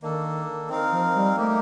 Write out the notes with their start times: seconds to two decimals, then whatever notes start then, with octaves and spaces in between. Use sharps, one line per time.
0.02 D#3 A#3 D4 A4
0.69 D#3 C4 D#4 A#4 F5
0.91 F3
1.15 G3
1.36 A3 A#3 D#4 G4 A#4